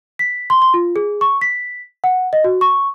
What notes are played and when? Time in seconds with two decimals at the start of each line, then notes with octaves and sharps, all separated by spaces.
0.19 B6
0.50 C6
0.62 C6
0.74 F4
0.96 G#4
1.21 C#6
1.41 B6
2.04 F#5
2.33 D#5
2.44 F#4
2.61 C#6